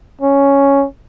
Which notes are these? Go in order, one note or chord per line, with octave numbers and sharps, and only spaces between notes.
C#4